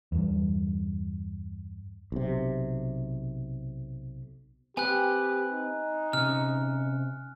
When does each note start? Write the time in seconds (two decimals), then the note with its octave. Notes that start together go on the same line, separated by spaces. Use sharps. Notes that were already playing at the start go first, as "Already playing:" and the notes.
0.12 E2 G2
2.12 B1 C3
4.77 C4 G4 B4 G#5 F#6
5.52 D#4
6.13 C3 C#4 F6